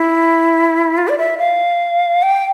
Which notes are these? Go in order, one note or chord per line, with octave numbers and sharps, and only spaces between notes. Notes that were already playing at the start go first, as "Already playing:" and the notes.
Already playing: E4
F4
D5
E5
F5
G5